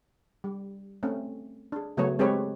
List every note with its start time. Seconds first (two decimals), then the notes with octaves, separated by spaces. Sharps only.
0.44 G3
1.03 A3 C4 C#4
1.72 D4 G#4
1.97 C#3 F#3 A3 B3 C#5
2.19 G#3 C4 G4 A4 B4 C#5